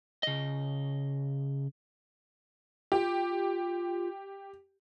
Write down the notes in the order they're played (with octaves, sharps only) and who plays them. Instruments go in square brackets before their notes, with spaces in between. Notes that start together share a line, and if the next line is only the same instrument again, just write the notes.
[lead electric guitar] C#3 D#5
[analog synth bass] F4 [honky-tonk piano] G4